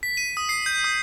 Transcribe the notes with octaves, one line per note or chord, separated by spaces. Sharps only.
B6
D#7
D#6
C7
G6
D#6